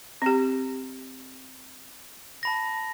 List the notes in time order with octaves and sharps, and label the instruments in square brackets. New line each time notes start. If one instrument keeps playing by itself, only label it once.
[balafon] C4 G4
[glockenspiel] A5 B5 A#6